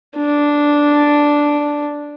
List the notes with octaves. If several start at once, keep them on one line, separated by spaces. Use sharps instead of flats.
D4